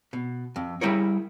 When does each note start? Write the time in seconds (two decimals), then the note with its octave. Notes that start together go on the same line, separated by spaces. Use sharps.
0.13 B2
0.56 F2
0.81 G3 E4 G#4 A#4 C#5